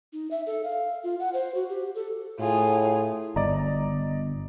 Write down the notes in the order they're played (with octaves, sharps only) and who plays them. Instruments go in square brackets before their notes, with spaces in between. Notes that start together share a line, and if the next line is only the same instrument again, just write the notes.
[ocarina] D#4
E5
A4
F5
F4
F#5
C5
F#4
G4
A4
[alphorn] A2 [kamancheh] F4 G#4
[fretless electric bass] G1 [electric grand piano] D5 D#5 A#5